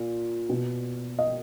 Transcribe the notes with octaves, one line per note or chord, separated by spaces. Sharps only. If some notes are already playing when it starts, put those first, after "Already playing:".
Already playing: A#2
B2
D#5